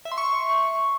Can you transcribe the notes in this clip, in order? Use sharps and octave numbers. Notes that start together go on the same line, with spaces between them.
E5
C6
C#6